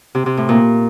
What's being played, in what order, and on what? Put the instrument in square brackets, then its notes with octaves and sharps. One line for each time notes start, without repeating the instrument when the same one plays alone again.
[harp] C3
C3
A2
A#2